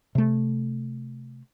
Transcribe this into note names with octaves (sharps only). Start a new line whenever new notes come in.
C3 A3